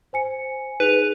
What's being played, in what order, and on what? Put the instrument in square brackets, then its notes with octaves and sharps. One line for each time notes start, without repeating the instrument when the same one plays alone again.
[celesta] C5 G#5 C#7
[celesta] D#4 G#4 F7 [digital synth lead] B4